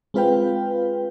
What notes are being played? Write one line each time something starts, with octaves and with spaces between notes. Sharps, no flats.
G#3 C4 F4 B4 F5 G5